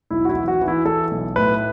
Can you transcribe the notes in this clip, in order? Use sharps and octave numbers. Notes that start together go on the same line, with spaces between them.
B1 E4
F#4
E4
E3
F#4
E3
E4
E3 A4
B1
A2 B4